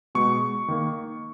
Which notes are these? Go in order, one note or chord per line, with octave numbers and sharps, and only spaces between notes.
B2 G#3 C#6
D#3 A#3